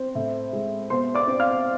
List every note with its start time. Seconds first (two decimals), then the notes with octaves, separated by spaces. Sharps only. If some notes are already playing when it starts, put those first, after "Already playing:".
Already playing: C4
0.15 A2
0.53 G#3
0.90 B2 C5 C6
1.15 D5 D6
1.27 C4
1.40 F5 F6